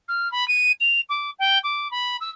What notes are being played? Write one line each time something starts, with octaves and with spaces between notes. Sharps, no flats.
F6
B5
D#7
F7
D6
G5
D6
B5
E6